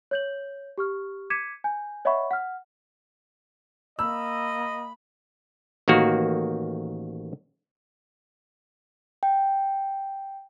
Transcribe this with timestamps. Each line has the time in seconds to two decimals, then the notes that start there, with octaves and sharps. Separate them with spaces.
0.11 C#5 G6 F#7
0.78 G4 C#6 F6
1.30 D6 G#6 B6 C#7 D#7 E7
1.64 G#5 G6
2.05 C#5 D#5 E5 F#5 B5 C#6
2.31 F#5 F6
3.99 A#3 D#5 B5 E6
5.88 A1 D#3 A#3 F#4
9.23 G5